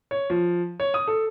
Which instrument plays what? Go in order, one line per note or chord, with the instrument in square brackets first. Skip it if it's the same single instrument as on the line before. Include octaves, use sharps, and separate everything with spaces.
[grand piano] C#5
F3
C#5
D#6
A4